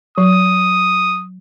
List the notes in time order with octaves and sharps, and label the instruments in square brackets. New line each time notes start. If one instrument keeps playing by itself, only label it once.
[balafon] F#3 [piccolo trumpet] D#6